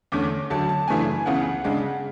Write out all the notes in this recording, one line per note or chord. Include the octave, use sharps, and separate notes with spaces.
E2 D3 A3 C#4 D6
D2 D3 F#3 A5
A5
F#2 C#3 E3 A3 D4 G#5
C#2 C#3 E3 B3 F#5
C#3 G#3 D4